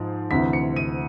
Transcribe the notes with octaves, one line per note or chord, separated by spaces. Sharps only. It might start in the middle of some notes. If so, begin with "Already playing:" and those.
Already playing: G#2 F3
D2 C3 E3 B6
C#7
D#7